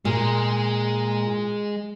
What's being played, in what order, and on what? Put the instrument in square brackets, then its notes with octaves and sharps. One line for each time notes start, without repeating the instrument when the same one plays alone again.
[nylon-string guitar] A#2 [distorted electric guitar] G#3